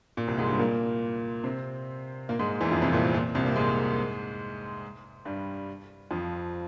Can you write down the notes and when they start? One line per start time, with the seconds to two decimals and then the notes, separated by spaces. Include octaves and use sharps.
0.17 A#2
0.28 C2 C3
0.38 G#2 G#3
0.49 G2 G3
0.59 A#2 A#3
1.44 C3 C4
2.29 A#2 A#3
2.39 G#2 G#3
2.61 E2 E3
2.71 F2 F3
2.82 C2 C3
2.93 A#2
3.04 A#2
3.14 A#2
3.35 C2 C3
3.46 A#3
3.56 G#2 G#3
5.25 G2 G3
6.11 F2 F3